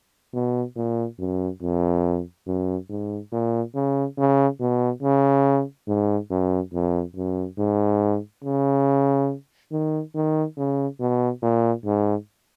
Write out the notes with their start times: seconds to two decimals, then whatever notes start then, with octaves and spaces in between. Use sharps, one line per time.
0.33 B2
0.76 A#2
1.19 F#2
1.62 F2
2.47 F#2
2.90 G#2
3.32 A#2
3.75 C#3
4.17 C#3
4.60 B2
5.03 C#3
5.88 G#2
6.30 F#2
6.73 F2
7.16 F#2
7.58 G#2
8.44 C#3
9.72 D#3
10.14 D#3
10.57 C#3
11.00 B2
11.43 A#2
11.85 G#2